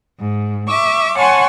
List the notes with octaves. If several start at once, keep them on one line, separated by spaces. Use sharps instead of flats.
G#2
E5 C#6 D6
C#5 F#5 G#5 A5 C6 C#6